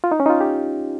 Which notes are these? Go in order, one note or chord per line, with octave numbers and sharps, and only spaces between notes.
F4
D#4
C#4
D#4
F4
G4